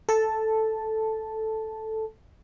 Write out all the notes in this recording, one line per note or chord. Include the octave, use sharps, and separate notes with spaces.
A4 A5